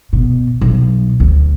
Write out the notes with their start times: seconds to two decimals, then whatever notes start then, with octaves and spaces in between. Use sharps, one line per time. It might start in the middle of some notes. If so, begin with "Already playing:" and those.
0.13 B2
0.61 B1
1.20 D2